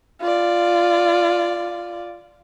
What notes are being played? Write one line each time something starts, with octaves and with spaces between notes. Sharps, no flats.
F4 D5